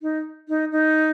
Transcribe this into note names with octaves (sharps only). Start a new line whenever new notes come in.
D#4
D#4
D#4